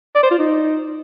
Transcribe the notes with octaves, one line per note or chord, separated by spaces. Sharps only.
D5
C5
F4
D#4